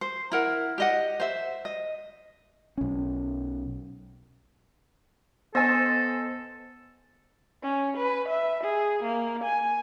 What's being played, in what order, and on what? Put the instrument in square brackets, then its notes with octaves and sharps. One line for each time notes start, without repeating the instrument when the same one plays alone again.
[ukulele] C5
E4 A#4 F#5
G4 D#5 F#5
C5 E5
D#5
[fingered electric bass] B1 C#4
[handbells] B3 E6 A#6 [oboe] A4 [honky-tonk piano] C5 D#5 G#5
[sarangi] C#4
B4
E5
G#4
A#3
G#5